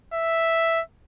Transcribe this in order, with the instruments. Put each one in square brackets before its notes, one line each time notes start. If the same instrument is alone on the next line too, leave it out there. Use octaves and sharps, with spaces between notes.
[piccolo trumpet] E5